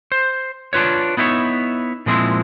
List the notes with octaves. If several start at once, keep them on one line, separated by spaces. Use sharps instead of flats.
C5
D4 F4 B4 C#5
B3 D#4 E4 A#4 C#5
A#2 F3 G#3 C4 E4